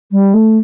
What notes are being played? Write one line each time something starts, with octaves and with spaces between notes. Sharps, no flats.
G3
A3